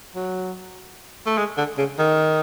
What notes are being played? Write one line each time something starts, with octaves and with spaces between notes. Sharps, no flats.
F#3
A3
G#3
D3
C#3
D#3